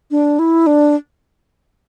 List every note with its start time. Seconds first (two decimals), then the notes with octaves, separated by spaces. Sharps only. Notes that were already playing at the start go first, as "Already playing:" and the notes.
0.11 D4
0.39 E4
0.67 D4